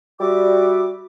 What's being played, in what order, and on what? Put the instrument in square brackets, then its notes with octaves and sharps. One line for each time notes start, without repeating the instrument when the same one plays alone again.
[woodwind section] G3 F#4 E5 D6